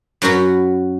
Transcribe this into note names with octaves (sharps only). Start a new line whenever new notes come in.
F#2 F#3 C#4 F#4 B5